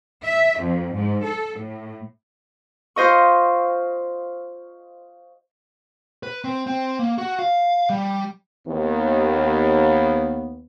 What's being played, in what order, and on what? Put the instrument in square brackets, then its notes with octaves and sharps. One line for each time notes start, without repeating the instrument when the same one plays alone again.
[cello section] E5
F2
G#2
A4
A2
[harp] F4 C5 D#5 C#6
[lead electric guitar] B4
C4
C4
A#3
F#4
F5
G3
[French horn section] D#2 B3